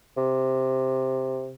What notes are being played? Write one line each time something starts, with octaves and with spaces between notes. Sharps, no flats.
C3